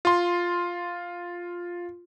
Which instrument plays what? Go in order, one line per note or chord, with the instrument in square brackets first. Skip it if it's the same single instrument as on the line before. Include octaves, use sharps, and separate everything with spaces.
[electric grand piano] F4 C6